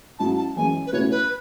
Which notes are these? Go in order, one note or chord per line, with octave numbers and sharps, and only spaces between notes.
G#2 F#3 C#4 E4 A5
A5
F#2 E3 G#3 G#5
B4
C#2 B2 A3 E4 C#5
B4